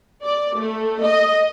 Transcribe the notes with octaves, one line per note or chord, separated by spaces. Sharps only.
D5
A3
D#5